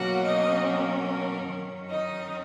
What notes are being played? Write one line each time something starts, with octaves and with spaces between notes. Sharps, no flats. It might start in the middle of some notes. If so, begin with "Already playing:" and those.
Already playing: B2 F#3 A#3 C#4 F#4 F#5
D#4 D#5
A#3 A#4
A#3 A#4
F#2 D#3 F#3 C#4
D#4 D#5